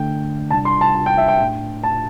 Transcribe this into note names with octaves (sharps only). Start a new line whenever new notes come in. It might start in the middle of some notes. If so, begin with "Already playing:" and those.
Already playing: D3 A3 D4 G5
C3 G3 D4 A5
C6
A5
A5
G5
E5
G5
A2 A3 D4
A5